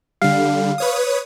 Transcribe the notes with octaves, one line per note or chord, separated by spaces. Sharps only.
D3 G3 F5
B4 C#5 D#6